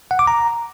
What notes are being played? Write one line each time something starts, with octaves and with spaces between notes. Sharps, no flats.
F#5
D6
A#5